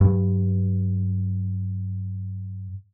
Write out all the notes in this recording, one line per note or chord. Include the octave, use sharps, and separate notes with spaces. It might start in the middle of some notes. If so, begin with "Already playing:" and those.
G2 F#3